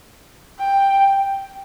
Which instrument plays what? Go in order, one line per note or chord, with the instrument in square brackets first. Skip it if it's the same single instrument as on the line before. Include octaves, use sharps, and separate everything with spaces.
[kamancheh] G5